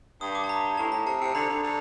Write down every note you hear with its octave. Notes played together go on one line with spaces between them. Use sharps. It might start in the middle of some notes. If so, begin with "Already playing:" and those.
G2 D#6
D6
A5
A#5
A2 A5
A2 A#5
C3 A5
C3
D3 A#5
D3
D3